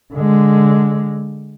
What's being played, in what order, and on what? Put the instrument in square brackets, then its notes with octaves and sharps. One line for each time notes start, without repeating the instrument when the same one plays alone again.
[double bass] D3 G#3